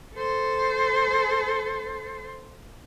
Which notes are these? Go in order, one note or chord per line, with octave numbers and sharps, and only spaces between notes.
A4 C5